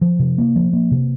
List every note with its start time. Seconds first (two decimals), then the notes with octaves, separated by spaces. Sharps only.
0.01 F3
0.19 C3
0.38 A#3
0.56 F3
0.73 A#3
0.91 C3